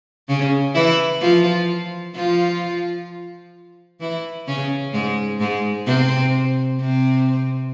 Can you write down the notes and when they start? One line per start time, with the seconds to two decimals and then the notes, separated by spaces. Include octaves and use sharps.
0.29 C#3 C#4
0.74 E3 E4
1.21 F3 F4
2.15 F3 F4
4.00 E3 E4
4.47 C#3 C#4
4.93 G#2 G#3
5.40 G#2 G#3
5.86 C3 C4
6.80 C3 C4